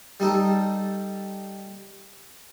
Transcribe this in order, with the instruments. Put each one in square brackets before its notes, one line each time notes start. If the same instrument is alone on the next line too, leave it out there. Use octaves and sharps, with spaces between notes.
[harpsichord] G3 D#4 A4